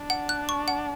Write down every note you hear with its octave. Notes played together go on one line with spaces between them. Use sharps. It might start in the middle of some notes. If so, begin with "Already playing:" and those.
Already playing: D4
F#5
F#6
C#6
F#5